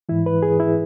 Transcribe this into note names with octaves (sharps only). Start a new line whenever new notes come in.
G#2 E3 E4
B4
G#4
E4